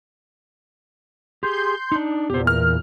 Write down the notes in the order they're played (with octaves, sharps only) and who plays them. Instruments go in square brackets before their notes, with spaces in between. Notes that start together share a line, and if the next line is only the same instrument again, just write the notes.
[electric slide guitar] G4 G#4 [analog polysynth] C6 G6
[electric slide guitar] D4 D#4
[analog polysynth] E2 A#2 [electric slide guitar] G4 C5
[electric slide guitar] A#4 [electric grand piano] F6